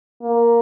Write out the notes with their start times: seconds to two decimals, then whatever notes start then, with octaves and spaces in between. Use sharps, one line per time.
0.22 A#3